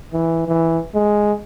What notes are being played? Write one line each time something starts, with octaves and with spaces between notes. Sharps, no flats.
E3
E3
G#3